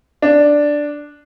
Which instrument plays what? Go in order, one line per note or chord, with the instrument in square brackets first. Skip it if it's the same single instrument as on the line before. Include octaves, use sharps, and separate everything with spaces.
[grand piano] D4